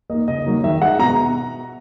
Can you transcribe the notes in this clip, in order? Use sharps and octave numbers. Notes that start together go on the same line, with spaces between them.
A#3 D#4 D#5
C#3 D#5
F#3 A#3 D#4
D#3 E5
G#3 D#4 F#5
B2 A#5